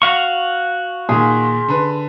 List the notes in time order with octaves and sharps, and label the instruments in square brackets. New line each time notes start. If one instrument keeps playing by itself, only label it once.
[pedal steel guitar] F#4 F5 C#6
[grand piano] A#2 D#3 [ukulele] G#4 [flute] C6
[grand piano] D3 B4